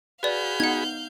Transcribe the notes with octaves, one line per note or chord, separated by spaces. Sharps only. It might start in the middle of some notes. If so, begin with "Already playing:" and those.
F#4 G#4 B4 D5 F5 B5 G6
B3 D#4 F#5 G#6